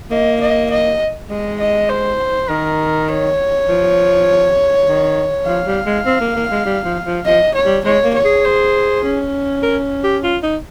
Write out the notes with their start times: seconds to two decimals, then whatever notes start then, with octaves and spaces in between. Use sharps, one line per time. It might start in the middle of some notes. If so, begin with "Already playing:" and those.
0.11 A#3 D#5
0.41 D#5
0.71 D#5
1.30 G#3 D#5
1.60 D#5
1.89 C5
2.49 D#3 A#4
3.08 C#5
3.68 F3
4.87 D#3
5.47 F3 F5
5.66 G3
5.86 G#3
6.06 C4
6.21 A#3
6.36 A#3
6.51 G#3
6.66 G3
6.85 F3
7.06 F3
7.26 F3 D#5
7.55 C#5
7.65 G3
7.85 G#3 C#5
8.04 A#3
8.14 C#5
8.25 G#4
8.44 C5
9.04 C#4
9.63 A#4
10.03 G4
10.23 F4
10.43 D#4